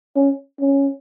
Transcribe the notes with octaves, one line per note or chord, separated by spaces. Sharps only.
C#4
C#4